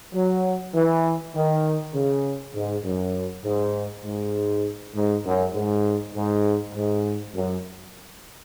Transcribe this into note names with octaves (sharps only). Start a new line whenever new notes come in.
F#3
E3
D#3
C#3
G#2
F#2
G#2
G#2
G#2
F#2
G#2
G#2
G#2
F#2